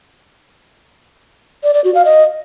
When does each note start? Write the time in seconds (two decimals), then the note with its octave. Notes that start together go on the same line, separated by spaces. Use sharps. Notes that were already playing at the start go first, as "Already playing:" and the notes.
1.64 D5
1.74 D5
1.84 F#4
1.95 F5
2.05 D#5